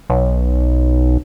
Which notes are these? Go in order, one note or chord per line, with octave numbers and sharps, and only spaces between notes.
B1